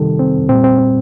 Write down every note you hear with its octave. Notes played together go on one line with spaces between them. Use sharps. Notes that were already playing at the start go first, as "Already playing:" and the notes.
Already playing: C3 D#3 G3 A4
C4
A#2 G3 C4
C4
C4